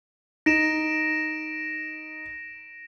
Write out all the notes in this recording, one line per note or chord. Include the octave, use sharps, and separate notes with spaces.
D#4 A#6 D7 E7